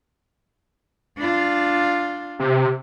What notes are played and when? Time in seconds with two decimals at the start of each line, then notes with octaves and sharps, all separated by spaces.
1.17 D4 F4
2.39 C3